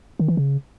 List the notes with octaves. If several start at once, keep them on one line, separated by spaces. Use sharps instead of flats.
D#3
E3
C#3